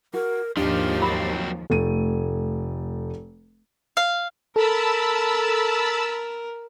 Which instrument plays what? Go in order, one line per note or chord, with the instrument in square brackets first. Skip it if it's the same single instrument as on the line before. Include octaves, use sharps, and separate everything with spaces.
[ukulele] F#4 [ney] A#4
[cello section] D#2 G#2 F3 [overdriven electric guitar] D#3 F4 [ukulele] D4 [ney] G4
[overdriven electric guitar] F#3 C4 [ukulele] B5
[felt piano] F1 A3 D#7
[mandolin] F5
[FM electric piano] A4 [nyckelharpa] A#4 [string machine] A5 B5 E6